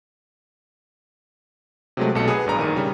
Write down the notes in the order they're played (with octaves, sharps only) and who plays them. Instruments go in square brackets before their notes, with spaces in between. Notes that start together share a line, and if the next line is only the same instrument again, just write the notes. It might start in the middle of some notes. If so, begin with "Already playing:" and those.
[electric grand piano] C3 F#3 G#3 A3
B1 B2 A4 C#7
G#4 B4 D#6
A1 G2 A#5
A#1 D#3 D#7
C#3 G3